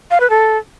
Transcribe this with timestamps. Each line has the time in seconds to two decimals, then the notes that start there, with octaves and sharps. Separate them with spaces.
0.11 F5
0.20 B4
0.30 A4